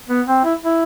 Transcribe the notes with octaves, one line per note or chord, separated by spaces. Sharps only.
B3
C4
E4
E4